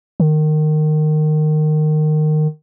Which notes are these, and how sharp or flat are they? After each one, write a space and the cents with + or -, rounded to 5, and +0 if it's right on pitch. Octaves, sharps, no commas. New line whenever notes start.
D#3 -20